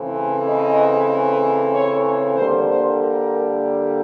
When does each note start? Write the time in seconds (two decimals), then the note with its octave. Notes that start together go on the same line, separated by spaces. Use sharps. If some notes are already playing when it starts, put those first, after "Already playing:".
Already playing: C#3 E3 A3 C4
0.47 D#5
1.74 C#5
2.36 D3 G3 A#3 C5
2.69 C5
2.99 A#4